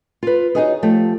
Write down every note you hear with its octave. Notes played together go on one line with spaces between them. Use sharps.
F4 B4
D#4 F4 F#4 G#4 C#5 D#5
F3 A3 G4